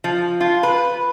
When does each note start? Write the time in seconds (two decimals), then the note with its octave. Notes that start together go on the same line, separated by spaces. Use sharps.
0.04 F3
0.41 F4
0.63 B4